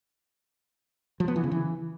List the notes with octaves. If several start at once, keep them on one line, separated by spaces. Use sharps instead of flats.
F3
B3
E3
C#3
E3